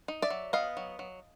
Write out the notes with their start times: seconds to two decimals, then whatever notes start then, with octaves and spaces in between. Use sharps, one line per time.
0.08 D#4
0.22 D5 E5
0.30 F#3
0.53 B3 D#5 F5
0.77 F#3
0.99 F#3